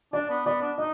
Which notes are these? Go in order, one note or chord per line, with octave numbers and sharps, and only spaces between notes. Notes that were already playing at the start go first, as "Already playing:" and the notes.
D4 D5
B3
B3 D5
D4
D#4 D#5